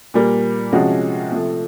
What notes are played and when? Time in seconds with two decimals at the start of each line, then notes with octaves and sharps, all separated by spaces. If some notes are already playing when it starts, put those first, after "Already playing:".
0.14 A#2 G3 A#3
0.73 C3 F3 G#3 C#4 F#4
1.32 C3 F3 A3